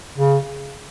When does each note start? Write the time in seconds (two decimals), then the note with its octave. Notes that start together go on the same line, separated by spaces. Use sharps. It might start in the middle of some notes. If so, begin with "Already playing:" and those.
0.18 C#3